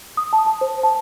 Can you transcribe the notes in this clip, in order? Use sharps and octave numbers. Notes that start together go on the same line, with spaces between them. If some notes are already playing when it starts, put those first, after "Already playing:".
D#6
A5
A5
C5
A5